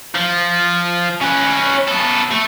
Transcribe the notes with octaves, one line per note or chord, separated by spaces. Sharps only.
F3
C#4 B4
B3 A4
A3